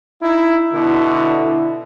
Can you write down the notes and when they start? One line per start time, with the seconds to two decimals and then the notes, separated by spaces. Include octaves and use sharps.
0.22 D#4 E4
0.73 B2 D3 E4